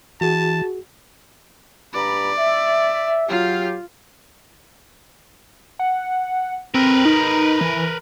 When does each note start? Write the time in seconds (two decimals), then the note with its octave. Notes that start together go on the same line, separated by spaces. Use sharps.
0.21 E3 F#4 G#4 A5
1.94 G2 D5 A#5 B5
2.37 E5
3.29 F#3 F4 G4 F5
5.79 F#5
6.74 C4 A#4 B4
7.05 D#4
7.61 E3